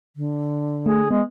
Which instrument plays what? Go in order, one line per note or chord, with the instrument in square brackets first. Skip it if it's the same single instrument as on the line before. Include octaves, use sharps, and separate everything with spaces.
[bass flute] D3
[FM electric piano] A3 [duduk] G#4
[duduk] G#3 [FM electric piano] B3